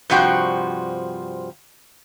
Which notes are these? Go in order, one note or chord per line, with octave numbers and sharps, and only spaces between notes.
G2 C3 F3 F#4 G5